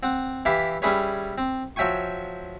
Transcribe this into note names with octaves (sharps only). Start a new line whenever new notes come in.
C4 F#5
E3 E4 G4 F5 B5
G3 C#4 E4 G#4 B4 C#5
C4
F3 F#3 E5 G5 G#5 C#6